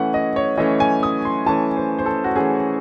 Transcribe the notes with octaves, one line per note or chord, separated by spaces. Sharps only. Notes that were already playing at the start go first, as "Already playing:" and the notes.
Already playing: E3 A3 C#4 F#5
D#5
C#5
E3 A3 C#4 D#5
G#5
D#6
C6
E3 A3 C#4 A5
C5
C5
A4
F#4
E3 A3 C#4 G#4